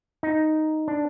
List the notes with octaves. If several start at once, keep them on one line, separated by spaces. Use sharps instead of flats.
D#4
D4